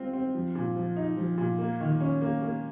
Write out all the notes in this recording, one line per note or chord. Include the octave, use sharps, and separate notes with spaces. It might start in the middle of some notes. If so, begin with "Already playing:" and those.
Already playing: C4 F4
C4
F3
A#2
F3
D#4
F3
A#2
A#3
D#3
C#4
A#3
A#3